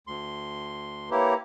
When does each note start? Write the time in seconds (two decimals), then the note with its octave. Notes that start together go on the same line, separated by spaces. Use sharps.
0.07 D2 C6
1.11 A#3 E4 G4 B4 C#5 A#5